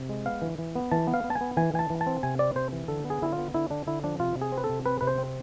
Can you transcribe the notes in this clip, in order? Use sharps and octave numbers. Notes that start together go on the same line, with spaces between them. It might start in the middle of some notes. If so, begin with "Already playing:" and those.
Already playing: C3
G#3
B3 F5
E3
E3
B3
E3 A5
B3
F5
B3
A5
G#5
B3
E3 G#5
E3 G#5
A5
E3
A5
C4
C3 G#5
C4 D5
C3 C5
E3
D3 A4
B3
G#4
D3 E4
F4
B3
D3 E4
D3 D4
D3 E4
F3 D4
C3 F4
C3
G#4
C4
B4
A4
C3
C4 B4
C3 B4
C5
C4